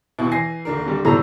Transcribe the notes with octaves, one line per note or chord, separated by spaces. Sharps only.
D#2 B2 E4
E3 G#5 A#6 C7
D#1 D4 A#4
D3 G3
G#1 B2 E4 A4 A#5